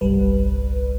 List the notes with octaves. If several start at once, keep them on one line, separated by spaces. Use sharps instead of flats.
G1 C2 G3 B4